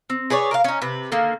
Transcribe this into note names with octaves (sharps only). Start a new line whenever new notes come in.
C4
G#4 B4 C#5 D5
A#4 E5 F5
C#4 D#4
C3 B4
D3 D#3 A#3